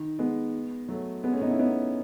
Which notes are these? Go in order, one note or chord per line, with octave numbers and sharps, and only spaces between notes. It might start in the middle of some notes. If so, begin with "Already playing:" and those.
Already playing: D#3
G#3 B3
F#3 A3
G#3 B3
A3 C#4
B3 D#4
C#4 E4
B3 D#4